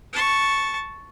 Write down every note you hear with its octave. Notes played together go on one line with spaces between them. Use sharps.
A5 C#6